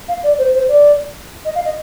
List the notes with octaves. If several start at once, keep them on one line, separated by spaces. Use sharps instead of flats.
F5
D5
C5
C5
D5
D#5
F5
D#5